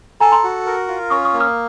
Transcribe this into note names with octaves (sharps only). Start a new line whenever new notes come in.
A4 G#5 A#5
A#5 C6
F#4
A#4
F4
C#4 C#6 D#6
C#6 D#6
A#3
D#6 F6